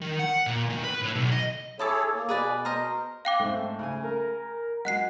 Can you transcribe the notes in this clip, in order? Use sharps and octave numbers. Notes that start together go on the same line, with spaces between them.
D#3
F#5
A#2
D#3
B4
A2
B1
D#5
E4 G#4 A4 C#5 A5 D6
A#3
B2 G#4 B4 D5
A#4 C5 D#5
F5 G5 D6 F#6
G#2 A3 C4
C#3 G#5
A#4
F#3 G#3 F#5 F#6 C7